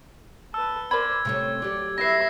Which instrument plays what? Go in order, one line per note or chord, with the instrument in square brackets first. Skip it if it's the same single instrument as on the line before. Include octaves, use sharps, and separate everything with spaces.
[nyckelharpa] B4 A5 [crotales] E6
[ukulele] A#4 B5 [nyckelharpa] C5 D5 [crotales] G#6
[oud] C3 A3 C#4 [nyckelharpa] C5
[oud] F#3 G4 [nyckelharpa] D5
[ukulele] E4 B4 [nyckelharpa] E5 B5 [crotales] A#6 C7